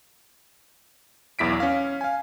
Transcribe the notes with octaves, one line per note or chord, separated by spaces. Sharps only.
B1 E2 E4 B6 D7
C#4 F5
F5 G#5